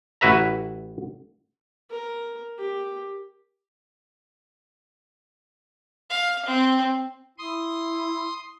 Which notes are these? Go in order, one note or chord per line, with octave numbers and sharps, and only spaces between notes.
A1 E4 F#4 B4 E5 A#5
A#4
G4
F5
C4
E4 C6 D#6